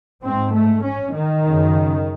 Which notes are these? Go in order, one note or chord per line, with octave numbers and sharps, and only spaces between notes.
G#2 C4
A3
C#4
D#3
F#2 C#3